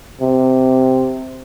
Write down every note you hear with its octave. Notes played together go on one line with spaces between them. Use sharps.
C3